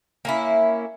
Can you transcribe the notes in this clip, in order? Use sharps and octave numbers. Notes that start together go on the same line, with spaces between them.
A#3 C#4 E4